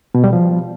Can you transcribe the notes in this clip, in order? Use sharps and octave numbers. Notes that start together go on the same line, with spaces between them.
B2
G3
F3